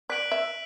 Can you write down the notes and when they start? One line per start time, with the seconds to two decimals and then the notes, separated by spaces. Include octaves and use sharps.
0.10 D5 F#6 B6 D7 F#7
0.32 E5